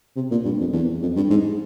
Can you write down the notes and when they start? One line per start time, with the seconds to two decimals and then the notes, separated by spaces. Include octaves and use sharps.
0.16 C3
0.31 A#2
0.45 G2
0.60 F2
0.73 E2
1.02 F2
1.16 G2
1.30 G#2